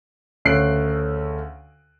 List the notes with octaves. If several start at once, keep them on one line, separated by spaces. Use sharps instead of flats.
D2 C#3 A3 F#6 C7 D7